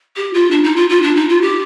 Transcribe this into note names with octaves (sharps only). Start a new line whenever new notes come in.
G4
F4
D4
D#4
F4
F4
D4
D#4
F4
G4